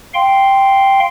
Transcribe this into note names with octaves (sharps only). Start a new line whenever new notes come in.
F5 G5 C6